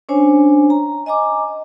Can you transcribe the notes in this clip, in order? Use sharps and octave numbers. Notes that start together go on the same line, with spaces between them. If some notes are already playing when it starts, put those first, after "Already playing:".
C#4 D4 C5 C#5 G#5
A#5
D#5 G#5 A#5 D6